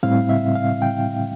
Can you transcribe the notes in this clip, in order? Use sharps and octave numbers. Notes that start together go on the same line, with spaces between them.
A2 G3 C4 E4 F5
E5
F5
G5